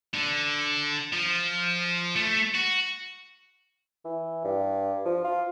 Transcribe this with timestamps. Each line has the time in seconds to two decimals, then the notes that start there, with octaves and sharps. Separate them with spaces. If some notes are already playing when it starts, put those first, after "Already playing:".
0.14 D3
1.13 F3
2.16 A3
2.55 F#4
4.05 E3
4.45 G2
5.06 F3
5.25 F4